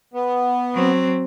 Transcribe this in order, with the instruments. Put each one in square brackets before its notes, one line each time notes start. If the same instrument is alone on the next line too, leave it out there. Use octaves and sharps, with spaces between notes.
[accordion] B3
[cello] F#3 C4